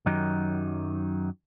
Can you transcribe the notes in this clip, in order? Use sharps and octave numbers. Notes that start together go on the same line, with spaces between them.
F#2 D#3 F#3 D#4 G4